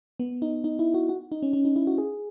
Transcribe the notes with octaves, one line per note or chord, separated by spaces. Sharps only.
B3
D#4
D#4
E4
F#4
F#4
D#4
C#4
C#4
D#4
E4
F#4
G#4